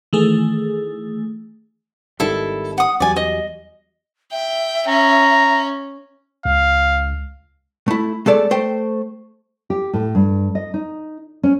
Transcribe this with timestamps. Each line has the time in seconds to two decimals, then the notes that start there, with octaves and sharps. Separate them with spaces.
0.13 D#3 E3 A3 G#4
2.20 G#1 D#3 G3 E4 A4
2.78 F#5 D#6
3.00 E2 F#3 G3 D5 G#5
3.16 D#5
4.32 E5 G5
4.87 C#4 A#5
6.45 C#2 F5
7.88 A3 E4
8.26 G#3 A3 A4 D5
8.51 A3 C5 G5
9.70 G4
9.93 A2
10.15 G2
10.55 D#5
10.74 D#4
11.43 C#4